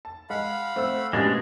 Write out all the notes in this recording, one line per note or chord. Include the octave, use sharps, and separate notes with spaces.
A5
G#3 F5 F#5 B5
A3 C4 C5 E6
B2 G#3 A3 C#4 D4 G4